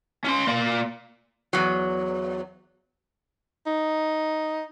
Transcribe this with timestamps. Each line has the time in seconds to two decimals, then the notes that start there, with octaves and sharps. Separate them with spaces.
0.24 C#4 C6
0.47 A#3 D5
1.53 E2 F#3
3.67 D#4